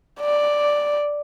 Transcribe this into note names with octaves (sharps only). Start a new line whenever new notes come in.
D5